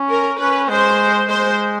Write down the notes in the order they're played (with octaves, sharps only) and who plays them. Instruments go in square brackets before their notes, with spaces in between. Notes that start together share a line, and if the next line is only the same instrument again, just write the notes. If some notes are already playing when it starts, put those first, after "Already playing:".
Already playing: [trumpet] C#4
[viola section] A#4
[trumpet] C#4 [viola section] B4
[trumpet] G#3 [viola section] C5
[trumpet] G#3 [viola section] C5